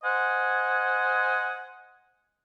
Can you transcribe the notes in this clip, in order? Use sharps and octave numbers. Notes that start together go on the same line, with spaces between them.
C5 D#5 F#5 G#5